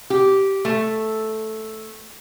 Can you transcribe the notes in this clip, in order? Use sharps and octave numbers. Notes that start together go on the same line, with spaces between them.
G4
A3